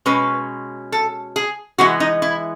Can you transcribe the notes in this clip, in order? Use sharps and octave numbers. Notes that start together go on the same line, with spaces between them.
B2 G#3 C#4 B4
A4
G#4
E3 G#3 B3 F#4
D#4
E4